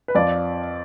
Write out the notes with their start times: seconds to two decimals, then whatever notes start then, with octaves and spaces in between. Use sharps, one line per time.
0.08 B4
0.15 F2 F3 D5